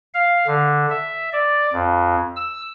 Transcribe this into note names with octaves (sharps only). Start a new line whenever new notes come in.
F5
D3
E5
D5
F2
E6